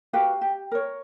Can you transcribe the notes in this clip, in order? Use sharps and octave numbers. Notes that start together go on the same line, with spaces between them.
F#4 G4 B4 F5
G4
A#4 C#5